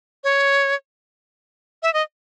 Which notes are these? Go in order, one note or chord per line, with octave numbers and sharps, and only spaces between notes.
C#5
E5
D#5